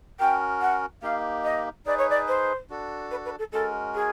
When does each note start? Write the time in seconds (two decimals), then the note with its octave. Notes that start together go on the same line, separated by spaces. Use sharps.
0.19 C#4 F#4 A#4 G5
0.61 F#5
1.02 A#3 D#4 G4 F5
1.44 D#5
1.86 D#4 G#4 B4 D5
1.97 C#5
2.10 D5
2.28 C5
2.70 D4 F#4 A4
3.11 B4
3.25 B4
3.38 A4
3.52 G#3 C#4 F#4 A4 A#4
3.95 G#4